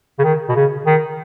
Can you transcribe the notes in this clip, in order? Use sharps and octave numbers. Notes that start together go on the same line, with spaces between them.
C#3
D#3
B2
C#3
D#3